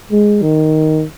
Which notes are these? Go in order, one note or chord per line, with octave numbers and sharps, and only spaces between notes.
G#3
D#3